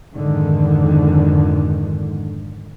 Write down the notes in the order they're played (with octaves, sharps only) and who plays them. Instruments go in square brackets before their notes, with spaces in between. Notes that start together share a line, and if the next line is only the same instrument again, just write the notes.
[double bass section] F2 G#2 D3 D#3